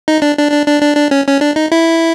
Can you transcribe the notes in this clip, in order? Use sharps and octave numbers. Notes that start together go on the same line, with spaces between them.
D#4
D4
D4
D4
D4
D4
D4
C#4
C#4
D4
D#4
E4